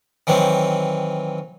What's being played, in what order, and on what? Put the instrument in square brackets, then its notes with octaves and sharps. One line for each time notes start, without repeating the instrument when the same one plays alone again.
[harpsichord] D#3 E3 F#3 C4